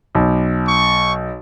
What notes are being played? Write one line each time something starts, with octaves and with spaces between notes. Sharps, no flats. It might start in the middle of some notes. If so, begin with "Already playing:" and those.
B1
C#6